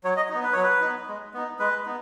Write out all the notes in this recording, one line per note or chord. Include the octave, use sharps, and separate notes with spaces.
F#3 C#5
D#5
D#4
B3
B4
F#3 C#5
B4
B3 D#4
G#3
B3 D#4
G#3 B4
B3 D#4